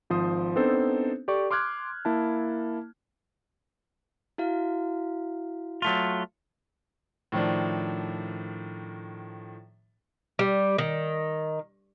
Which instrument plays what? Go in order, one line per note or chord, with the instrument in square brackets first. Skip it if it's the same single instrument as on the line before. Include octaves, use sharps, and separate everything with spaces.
[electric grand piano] G#1 F3 C5 C6 D#6
B3 C4 D4 D#4 A4 C5
G4 A4 D5 C#6
C6 D6 F6 F#6 G#6
A#3 E4 A5
[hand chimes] E4 F#4 F5
[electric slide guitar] F#3 A3 F4
[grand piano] A2 D#3 F3 D4
[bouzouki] G3
D#3